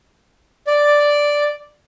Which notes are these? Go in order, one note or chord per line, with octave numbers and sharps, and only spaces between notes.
D5